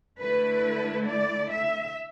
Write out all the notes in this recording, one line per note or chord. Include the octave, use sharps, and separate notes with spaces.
D3 A3 E4 B4
D5
E5